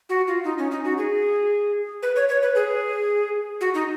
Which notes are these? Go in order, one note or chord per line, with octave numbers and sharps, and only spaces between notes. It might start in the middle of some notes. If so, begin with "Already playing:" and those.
F#4
F4
D#4
C#4
D#4
F#4
G#4
B4
C#5
C#5
B4
G#4
F#4
D#4